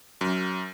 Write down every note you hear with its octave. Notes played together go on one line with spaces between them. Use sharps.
F#2